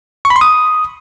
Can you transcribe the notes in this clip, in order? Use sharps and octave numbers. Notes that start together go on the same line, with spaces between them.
C#6
B5
C6
D#6